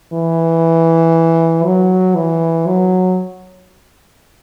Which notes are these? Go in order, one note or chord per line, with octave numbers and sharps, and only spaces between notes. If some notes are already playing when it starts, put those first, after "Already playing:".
E3
F#3
E3
F#3